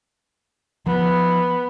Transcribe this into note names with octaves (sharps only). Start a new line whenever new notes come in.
F3 B3